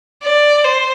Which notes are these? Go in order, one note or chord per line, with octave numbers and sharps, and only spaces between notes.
D5
C5